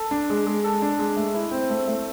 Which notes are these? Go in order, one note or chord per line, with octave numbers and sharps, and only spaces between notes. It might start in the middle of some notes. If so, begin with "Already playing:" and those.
Already playing: A4
D4
G#3
G#3
A4
D4
G#3
A3
E4
C4
A3
A3